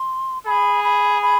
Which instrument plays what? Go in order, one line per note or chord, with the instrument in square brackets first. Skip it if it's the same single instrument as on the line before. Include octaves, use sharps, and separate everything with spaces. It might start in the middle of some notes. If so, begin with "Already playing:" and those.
Already playing: [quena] C6
[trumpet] G#4 [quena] B5
[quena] B5
B5